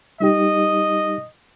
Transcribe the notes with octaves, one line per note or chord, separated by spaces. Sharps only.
G3 D#4 G4 D#5